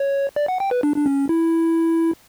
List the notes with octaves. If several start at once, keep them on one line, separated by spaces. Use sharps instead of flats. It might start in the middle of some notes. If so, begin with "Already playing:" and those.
Already playing: C#5
D5
F#5
G5
B4
D4
D4
C#4
E4